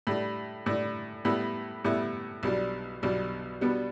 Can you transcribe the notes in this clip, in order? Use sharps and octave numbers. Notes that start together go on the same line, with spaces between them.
A2 G3 D4
A2 G3 D4
A2 G3 B3 E4
A2 G3 B3 E4
B1 B2 G3 D4
B1 B2 G3 D4
B2 G3 B3 D4